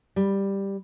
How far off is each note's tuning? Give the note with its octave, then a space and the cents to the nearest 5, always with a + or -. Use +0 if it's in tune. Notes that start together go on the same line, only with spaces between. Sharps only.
G3 +5